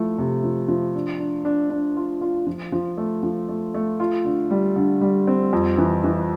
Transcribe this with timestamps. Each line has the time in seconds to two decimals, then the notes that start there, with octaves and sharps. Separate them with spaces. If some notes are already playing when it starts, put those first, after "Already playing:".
Already playing: F3 A3 E4
0.18 C3
0.44 F3
0.68 F3
0.95 D4
1.19 D4
1.45 D4
1.70 D4
1.96 F4
2.21 F4
2.47 F3
2.72 F3
2.97 A3
3.23 F3
3.49 A3
3.74 A3
4.00 F4
4.25 D3
4.50 G3
4.76 D3
5.01 G3
5.27 C4
5.53 F2
5.78 E3
6.04 E3